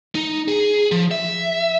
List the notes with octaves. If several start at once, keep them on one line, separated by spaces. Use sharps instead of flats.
D#4
G#4
F3
E5